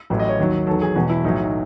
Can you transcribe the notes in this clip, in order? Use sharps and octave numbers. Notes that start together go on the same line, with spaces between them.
A1 A2 F#3
D#5
C#5
D#2 D#3 F#3
E2 D#3 F#3 A4
G#4
E1 E2 B2 F#3 F#4
E4
B1 A2 F#3 D#4